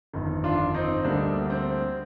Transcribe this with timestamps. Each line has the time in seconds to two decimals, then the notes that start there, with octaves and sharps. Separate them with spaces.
0.13 G1 F2 D#3
0.44 D4 F4
0.74 C4 D#4
1.04 D2 D3 G3 A#3 D4
1.50 C4